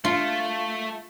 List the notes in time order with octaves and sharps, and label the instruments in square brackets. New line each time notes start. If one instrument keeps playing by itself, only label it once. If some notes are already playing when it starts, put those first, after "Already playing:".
[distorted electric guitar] A3 [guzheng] F4